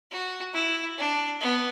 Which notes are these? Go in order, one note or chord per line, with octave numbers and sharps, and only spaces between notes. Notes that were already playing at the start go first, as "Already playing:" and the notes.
F#4
E4
D4
B3